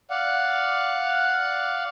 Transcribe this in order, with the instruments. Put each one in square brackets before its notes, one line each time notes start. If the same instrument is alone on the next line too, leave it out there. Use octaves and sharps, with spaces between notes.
[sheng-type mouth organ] D5 F5 F#5